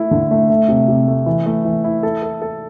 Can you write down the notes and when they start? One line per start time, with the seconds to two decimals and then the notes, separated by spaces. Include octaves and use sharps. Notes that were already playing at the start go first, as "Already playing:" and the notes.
Already playing: A3 E4
0.11 D3
0.31 A3
0.49 A3
0.68 C3
0.88 C3
1.08 A3
1.26 E3
1.46 A3
1.65 E3
1.84 E4
2.03 A4
2.22 A4
2.42 A4